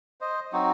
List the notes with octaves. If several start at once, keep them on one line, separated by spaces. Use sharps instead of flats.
C5 D#5
F#3 C4 D#4 F#4